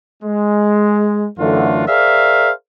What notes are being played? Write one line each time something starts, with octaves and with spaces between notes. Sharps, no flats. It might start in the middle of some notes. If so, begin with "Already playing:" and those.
G#3
F#2 D3 E3 A3 F4 F#4
G#4 A#4 C5 D5 E5 F5